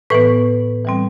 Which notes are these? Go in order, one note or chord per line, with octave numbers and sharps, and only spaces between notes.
A2 E3 B3 B4
E3 G3 C4